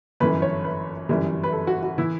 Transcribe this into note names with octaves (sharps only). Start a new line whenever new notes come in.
G1 F#2 E3 B4
C#5
B4
G1 F#2 E3 G3
B4
A4
F#4
F#4
E3 E4